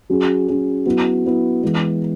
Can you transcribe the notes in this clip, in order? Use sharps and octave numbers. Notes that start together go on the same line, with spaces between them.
F#3 C#4 G#4
F#3 C#4 G#4
F#3 B3 E4
F#3 B3 E4
E3 G#3 B3